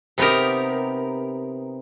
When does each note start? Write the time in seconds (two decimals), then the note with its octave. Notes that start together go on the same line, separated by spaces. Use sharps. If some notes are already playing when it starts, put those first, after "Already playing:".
0.18 C3 B3 D#4 G4 A#4